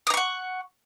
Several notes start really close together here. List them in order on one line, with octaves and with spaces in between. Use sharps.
D#6 A#5 C#6 F#5